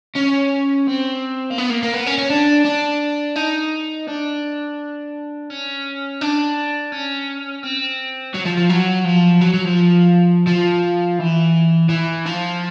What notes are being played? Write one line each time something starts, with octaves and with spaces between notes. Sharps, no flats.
C#4
C4
A#3
B3
A#3
A#3
B3
C#4
C#4
D4
D4
D#4
D4
C#4
D4
C#4
C4
F#3
F3
F3
F#3
F3
F#3
F#3
F3
F3
E3
E3
F3